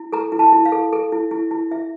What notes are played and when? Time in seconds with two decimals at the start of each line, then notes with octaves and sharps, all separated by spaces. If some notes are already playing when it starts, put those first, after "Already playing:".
Already playing: E4
0.13 A4 A#5
0.32 E4
0.39 A5
0.53 E4
0.65 F5
0.72 A4
0.93 A4
1.12 E4
1.31 E4
1.51 E4
1.71 E4 E5